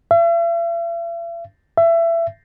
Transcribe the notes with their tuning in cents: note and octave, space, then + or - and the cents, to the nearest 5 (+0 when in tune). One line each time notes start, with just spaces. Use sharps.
E5 +45
E5 +25